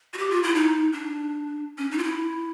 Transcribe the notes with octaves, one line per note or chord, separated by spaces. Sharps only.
F#4
G4
F4
E4
D#4
D4
C#4
D#4
F4
E4